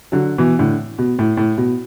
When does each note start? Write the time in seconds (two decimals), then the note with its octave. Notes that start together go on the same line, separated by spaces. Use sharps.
0.12 D3 F#3
0.38 B2 E3
0.59 A2 D3
0.99 B2
1.19 A2
1.37 A2
1.58 B2